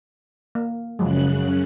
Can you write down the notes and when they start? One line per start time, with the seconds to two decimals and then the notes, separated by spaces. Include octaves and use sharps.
0.55 A#3
0.99 F#2 C#3 F3 F#3 G#3 F#6